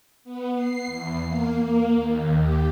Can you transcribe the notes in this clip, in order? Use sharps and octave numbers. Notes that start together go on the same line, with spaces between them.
B3
C7
E2
A#3
A#3
D#2
G4